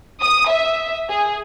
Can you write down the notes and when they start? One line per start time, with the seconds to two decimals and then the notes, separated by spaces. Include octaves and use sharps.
0.21 D#6
0.49 E5
1.10 G#4